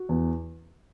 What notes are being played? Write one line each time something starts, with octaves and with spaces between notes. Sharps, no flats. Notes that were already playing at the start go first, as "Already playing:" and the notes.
Already playing: F#4
E2